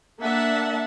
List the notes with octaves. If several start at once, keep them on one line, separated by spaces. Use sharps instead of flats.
A#3 D4 E5 F#5 A5